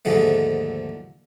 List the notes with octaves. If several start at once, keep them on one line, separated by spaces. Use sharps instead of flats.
D#2 G#2 D3 F3 G#3 A3